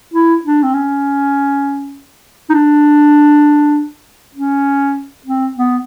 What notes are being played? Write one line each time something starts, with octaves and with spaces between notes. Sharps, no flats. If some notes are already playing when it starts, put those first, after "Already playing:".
E4
D4
C4
C#4
D#4
D4
C#4
C4
B3